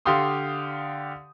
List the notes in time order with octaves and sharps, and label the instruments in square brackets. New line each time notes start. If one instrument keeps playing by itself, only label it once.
[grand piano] D3 G4 F5 C6 D#6